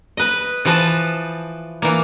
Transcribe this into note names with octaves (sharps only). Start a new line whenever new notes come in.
B4 D#5
E3 F3 B4 D#5 A5
E3 A#3